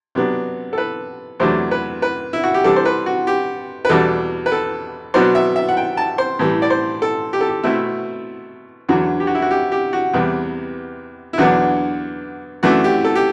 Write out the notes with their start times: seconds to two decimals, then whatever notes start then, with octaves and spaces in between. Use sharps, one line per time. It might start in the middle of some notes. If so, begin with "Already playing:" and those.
0.15 C3 F#3 B3 D4
0.73 A4
0.78 B4
1.40 E2 C3 F#3 A3 D4 C5
1.71 B4
2.02 B4
2.33 E4
2.44 F#4
2.54 G4
2.64 C3 E3 G3 D4 A4
2.76 C5
2.85 B4
3.06 F#4
3.27 G4
3.85 B4
3.89 E2 B2 G3 D4 A4
4.46 B4
4.52 A4
5.14 B2 F#3 B3 D4 C5
5.35 E5
5.56 E5
5.68 F#5
5.77 G5
5.97 A5
6.18 C5
6.39 A2 E3 G3
6.62 D5
6.70 C5
7.02 A4
7.33 G4
7.41 A4
7.48 G4
7.63 B2 A3 C4 E4
8.89 E2 D3 F#3 F#4
9.20 G4
9.27 F#4
9.35 E4
9.42 F#4
9.51 G4
9.72 G4
9.93 F#4
10.14 E2 C3 G3 B3
11.33 E4
11.38 E2 D3 F#3 B3 D4 F#4
12.63 F#2 E3 A3 D4 F#4
12.84 G4
13.04 A4
13.15 G4